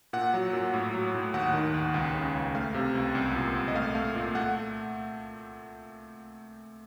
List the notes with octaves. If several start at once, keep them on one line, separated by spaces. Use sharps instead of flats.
A#2 F#5
F#3
A#2
A2
F#3
A2
D#2 F#5
D#3
D#2
C#2
C#3
C#2
A3 F5
C3
C#2
C2
A#2
C2
D#5
A3 F5
A3
A#2
A3 F#5